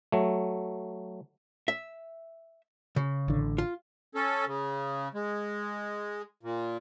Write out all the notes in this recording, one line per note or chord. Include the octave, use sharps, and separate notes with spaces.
F#3 A3
E5
C#3
A1 D3
F4
C#4 A4
C#3
G#3
A#2